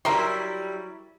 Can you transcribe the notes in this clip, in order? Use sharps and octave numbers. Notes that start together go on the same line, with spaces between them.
F#3 G3 E4 A#4 E5 C6